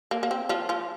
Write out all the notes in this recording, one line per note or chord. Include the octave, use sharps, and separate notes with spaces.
A#3
A#3
C4
F3 F4
F3 F4